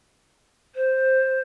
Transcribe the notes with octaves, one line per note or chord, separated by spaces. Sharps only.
C5